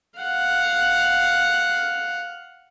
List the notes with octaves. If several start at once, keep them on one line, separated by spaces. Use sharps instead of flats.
F5 F#5